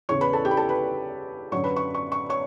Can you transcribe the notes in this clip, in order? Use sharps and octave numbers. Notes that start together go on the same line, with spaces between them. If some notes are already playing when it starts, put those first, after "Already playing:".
E2 C#3 E3 C#5 C#6
B4 B5
A4 A5
G4 G5
B5
A4 A5
B4 B5
F#2 D3 F#3 C#5 C#6
B4 B5
C#6
C#6
C#6
C#5 C#6